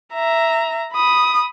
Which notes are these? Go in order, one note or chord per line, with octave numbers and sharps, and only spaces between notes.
E5 A#5
B5 D#6